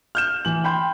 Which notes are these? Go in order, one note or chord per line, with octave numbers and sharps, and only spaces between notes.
F6 G6 E7
E3 F#7
G5 B5 C6 G6